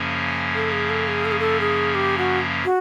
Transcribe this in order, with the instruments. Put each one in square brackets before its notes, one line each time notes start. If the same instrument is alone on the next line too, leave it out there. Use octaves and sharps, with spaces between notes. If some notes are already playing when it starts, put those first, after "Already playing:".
Already playing: [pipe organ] F#2 C#3 F3 A#3 C#4
[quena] A4
G#4
A4
G#4
A4
G#4
A4
G#4
G4
F#4
F#4